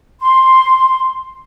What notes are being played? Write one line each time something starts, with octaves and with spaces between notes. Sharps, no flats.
C6